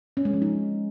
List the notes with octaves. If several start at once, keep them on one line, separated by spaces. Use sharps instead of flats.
C#4
G#3
F3
D#4